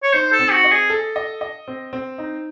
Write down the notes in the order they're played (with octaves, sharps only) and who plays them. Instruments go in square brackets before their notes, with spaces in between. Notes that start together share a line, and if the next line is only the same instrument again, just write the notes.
[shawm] C#5
[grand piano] D#4 [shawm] C5
[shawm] A4
[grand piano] C4
[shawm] F#4
[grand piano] D#5
[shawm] G#4
[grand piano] A4
D#5
D#5
C4
C4
D#4